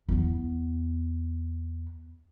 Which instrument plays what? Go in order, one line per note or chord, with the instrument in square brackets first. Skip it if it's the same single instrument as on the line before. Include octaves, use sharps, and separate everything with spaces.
[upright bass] E2 B3